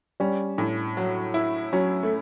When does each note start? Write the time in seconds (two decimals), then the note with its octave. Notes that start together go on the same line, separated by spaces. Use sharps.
0.20 G3 C#4
0.58 A2
0.97 F#3
1.34 E4
1.73 F#3 C#4
2.03 A3